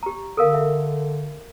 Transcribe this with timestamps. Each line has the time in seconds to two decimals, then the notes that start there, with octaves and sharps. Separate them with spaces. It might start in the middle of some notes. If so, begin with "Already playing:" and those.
0.03 G4 A#5
0.37 D3 A4 A#4 F5
0.54 E5